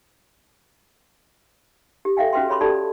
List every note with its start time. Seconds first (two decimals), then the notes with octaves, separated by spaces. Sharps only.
2.05 G4
2.17 A4 E5 F5 G5 G#5
2.33 C#4 F#4 B4 E5 G5 C6
2.48 G#4 C#5 B5 C6 D6
2.61 G4 A4 D5 A5 B5